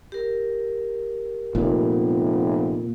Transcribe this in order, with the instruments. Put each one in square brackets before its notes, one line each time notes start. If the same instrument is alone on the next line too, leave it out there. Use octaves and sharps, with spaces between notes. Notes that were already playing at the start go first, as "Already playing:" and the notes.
[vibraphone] G4 A#4
[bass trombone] F1 [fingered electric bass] A#2 [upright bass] G#3 B3